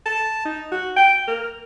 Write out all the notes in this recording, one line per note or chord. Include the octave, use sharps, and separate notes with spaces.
A5
D#4
F#4
G5
A#4